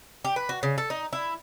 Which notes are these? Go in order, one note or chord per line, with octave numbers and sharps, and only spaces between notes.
G4
B4
F#4
C#3
A4
D#4
E4